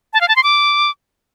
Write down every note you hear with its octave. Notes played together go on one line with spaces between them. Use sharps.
A5
F5
A5
C6
D6